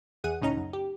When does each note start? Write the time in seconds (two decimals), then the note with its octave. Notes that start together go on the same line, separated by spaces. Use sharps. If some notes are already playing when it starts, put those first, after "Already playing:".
0.24 E2 G#4 F#5 D#7
0.41 C#2 A2 C#3 C#4 D#4 A#5
0.57 F#2
0.73 G4